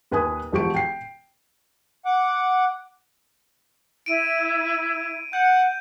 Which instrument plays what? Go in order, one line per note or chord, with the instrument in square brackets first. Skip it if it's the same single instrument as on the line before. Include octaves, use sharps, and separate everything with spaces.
[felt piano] D#2 B4 G#5 D#6
E1 F3 G4 C#6 D7
G5 C7
[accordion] F#5 D6
[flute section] E4 [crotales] D7 D#7
[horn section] F#5 [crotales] G6